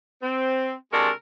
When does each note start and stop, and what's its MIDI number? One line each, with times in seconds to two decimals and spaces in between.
0.22 0.74 60
0.92 1.10 48
0.92 1.10 56
0.92 1.10 62
0.92 1.10 66
0.92 1.10 69
0.92 1.10 70